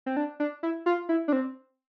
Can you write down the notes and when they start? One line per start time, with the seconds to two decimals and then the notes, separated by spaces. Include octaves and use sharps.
0.06 C4
0.17 D4
0.40 D4
0.63 E4
0.86 F4
1.09 E4
1.28 D4
1.33 C4